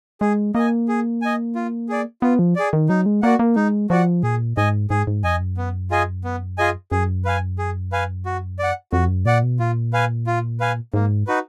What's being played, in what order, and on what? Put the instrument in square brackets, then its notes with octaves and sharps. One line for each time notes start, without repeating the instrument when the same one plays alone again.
[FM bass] G#3 [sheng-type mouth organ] G#4
[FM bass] A#3 [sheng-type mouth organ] D#5 G#5
[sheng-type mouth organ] G#4
D#5 G#5
F4
G#4 D5
[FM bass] B3 [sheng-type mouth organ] F4
[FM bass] F3
[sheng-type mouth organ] G#4 D5
[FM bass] D#3
[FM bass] F#3 [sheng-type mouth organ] D#4
[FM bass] G#3
[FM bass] A#3 [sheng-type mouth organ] F#4 D5 F#5
[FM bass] A#3
[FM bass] G#3 [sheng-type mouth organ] D#4
[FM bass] F3 [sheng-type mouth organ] F#4 D5 F#5
[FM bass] A#2 [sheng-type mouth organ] G#4
[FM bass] G#2 [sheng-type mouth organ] D#5 G#5
[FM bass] G#2 [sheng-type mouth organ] G#4
[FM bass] G#2
[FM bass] F2 [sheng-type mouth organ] D#5 G#5
[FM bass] F#2
[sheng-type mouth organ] B3
F4 G#4 D#5 G#5
B3
F4 G#4 D#5 G#5
[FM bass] F#2 [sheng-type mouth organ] G#4
[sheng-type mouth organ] B4 F5 G#5
G#4
B4 F5 G#5
F#4
D5 F#5
[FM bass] F2 [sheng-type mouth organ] F#4
[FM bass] F#2
[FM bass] A#2 [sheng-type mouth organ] D5 F#5
[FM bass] B2
[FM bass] A#2 [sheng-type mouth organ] F4
[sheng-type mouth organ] B4 F5 G#5
F4
B4 F5 G#5
[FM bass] G#2 [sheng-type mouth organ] A#3
[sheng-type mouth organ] D#4 F#4 B4